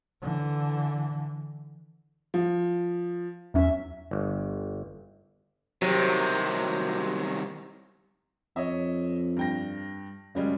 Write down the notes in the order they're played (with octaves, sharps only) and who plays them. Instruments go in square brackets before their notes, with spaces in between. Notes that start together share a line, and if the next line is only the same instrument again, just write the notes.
[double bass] D3 E3
[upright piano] F3
[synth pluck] E2 F#3 C#4 [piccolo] E5
[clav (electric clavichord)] G1
[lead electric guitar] C2 D#3 [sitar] C3 [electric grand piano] F#3
[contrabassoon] F2 [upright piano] C#5 D#5 E5
[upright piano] G2 G5 A#6
[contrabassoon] F#2 [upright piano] C#3 G3 G#3